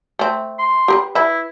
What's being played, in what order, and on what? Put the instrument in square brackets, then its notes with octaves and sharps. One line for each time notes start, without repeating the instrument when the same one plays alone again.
[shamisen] A3 C4
[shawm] C6
[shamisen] G4 A#4 B4
[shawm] E4 [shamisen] B4 E5